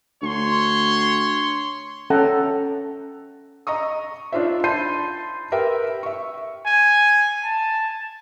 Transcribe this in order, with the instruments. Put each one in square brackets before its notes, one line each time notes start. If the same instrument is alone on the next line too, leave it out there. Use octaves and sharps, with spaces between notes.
[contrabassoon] D2 [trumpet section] C#5 C6
[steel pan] C#4 A4 E5 F#5 G5 A#5
[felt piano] D#5 A#5 C#6 D#6
D4 D#4 F4 C5 E5
A5 B5 C6 G6 C7 D#7
G4 A#4 B4 E5 G5
E5 C#6
[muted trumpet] G#5
A5